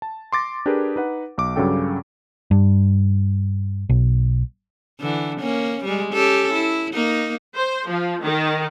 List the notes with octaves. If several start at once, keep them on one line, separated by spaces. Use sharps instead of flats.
A5
C6 D6 A6 A#6
D4 G4 G#4 A#4 B4
D#4 B4 F#5
B1 D6
G2 C#3 F#3 C#4 A4 G5
G2
B1
D3 E3
A#3 C#4
G3 G#3
C#4 G4 A4
E4
A#3 D#4
C5
F3
D#3